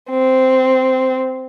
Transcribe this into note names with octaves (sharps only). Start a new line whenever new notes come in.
C4